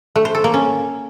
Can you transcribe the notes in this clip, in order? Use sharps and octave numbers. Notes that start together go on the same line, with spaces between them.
A3
C5
A4
A#3
C#4